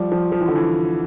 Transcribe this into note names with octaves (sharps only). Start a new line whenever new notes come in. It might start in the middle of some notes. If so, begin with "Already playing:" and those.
Already playing: F3 G3
F3
F3
E3
D3
E3